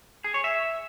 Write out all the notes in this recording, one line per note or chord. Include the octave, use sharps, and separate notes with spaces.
G#4
C#5
E5